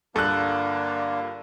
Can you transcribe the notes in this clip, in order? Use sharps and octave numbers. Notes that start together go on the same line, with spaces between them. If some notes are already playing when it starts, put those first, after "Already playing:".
G2 D3 A#3 D4 F4 A4 F#6